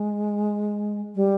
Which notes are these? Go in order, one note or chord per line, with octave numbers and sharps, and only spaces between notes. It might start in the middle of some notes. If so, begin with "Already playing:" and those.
Already playing: G#3
G3